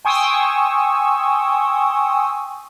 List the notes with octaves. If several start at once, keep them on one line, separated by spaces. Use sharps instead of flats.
G5 G#5 C6 C#6 D#6 E6